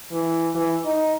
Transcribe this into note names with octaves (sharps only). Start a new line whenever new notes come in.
E3
E3
D#4